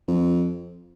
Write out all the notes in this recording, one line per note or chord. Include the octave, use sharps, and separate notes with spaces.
F2